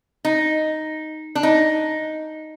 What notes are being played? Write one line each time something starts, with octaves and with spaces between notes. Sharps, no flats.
D#4
D4
D#4